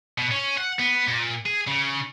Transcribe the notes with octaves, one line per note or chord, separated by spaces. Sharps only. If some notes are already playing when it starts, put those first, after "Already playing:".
B2
C#4
F#5
B3
A#2
G#4
C#3